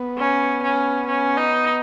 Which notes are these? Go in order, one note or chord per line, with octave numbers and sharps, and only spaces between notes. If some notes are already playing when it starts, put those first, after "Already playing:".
Already playing: B3
C#4
C#4
C#4
D#4